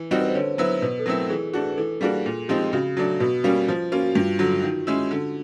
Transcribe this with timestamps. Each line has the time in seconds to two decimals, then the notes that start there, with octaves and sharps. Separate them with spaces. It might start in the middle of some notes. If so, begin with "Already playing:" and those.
Already playing: E3
0.11 G3 C4 D#4 F#4 A#4
0.20 B4
0.27 C5
0.35 D3 C#5
0.58 F#3 B3 E4 C5
0.82 B2 B4
0.99 A4
1.06 F#3 A3 C4 E4 A#4
1.30 E3 G#4
1.53 A3 D4 F#4 G#4
1.77 E3 A4
2.01 G3 A#3 D4 F#4 G#4
2.26 A#2
2.48 F3 G#3 C4 D#4 G4
2.73 C#3 F#4
2.97 F#3 A3 D4 F#4
3.20 B2 F#4
3.44 G3 A#3 C#4 F#4
3.68 F3 F4
3.92 A#3 C#4 F4 F#4
4.05 F#4
4.15 G2 F4
4.39 D3 F#3 F#4
4.63 D#3
4.87 G#3 C#4 E4
5.11 D3